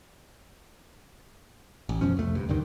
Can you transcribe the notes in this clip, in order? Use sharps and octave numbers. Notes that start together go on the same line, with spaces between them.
A1
F#2 B2 F3 C#4
C2 F2 A3
D2 G2
D2 G2 D3 D#3